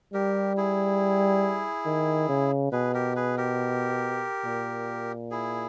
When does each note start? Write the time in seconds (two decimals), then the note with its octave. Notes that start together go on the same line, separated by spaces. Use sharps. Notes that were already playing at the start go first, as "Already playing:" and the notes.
0.14 G3 G4 A#4
0.57 E4 G#4
1.86 D#3
2.29 C#3
2.72 B2 G#4 B4
2.94 G4 A#4
3.16 G#4 B4
3.37 G4 A#4
4.45 A#2
5.31 E4 G#4